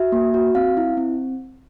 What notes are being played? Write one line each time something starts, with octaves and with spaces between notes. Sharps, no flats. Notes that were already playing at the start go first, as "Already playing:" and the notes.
Already playing: F#4 E5
A#3
F#4
C4 F5
E4
C4